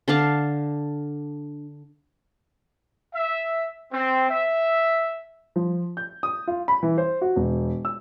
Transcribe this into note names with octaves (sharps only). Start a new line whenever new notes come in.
D3 D4 F5 A5
E5
C4
E5
F3
G6
D#6
F4
B5
E3
C5
F#4
E1
E6